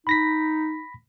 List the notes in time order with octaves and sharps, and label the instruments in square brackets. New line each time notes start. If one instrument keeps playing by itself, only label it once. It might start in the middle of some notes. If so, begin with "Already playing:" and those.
[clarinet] D#4 [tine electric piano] B5 A#6 B6